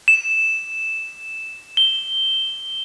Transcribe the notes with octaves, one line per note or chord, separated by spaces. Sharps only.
E7
G7